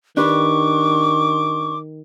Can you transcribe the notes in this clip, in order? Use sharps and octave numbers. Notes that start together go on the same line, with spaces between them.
D#3 D4 G4 B4 C#6 D6